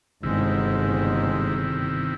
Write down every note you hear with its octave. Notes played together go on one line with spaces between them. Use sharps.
G1 G#2 C3 D#3 G#3 E4